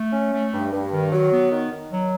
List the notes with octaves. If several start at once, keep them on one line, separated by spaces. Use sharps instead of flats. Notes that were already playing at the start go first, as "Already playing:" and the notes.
Already playing: A3
C#4
A3
G2
G2
D#3
F#3
B3
D#3
D#3
F#3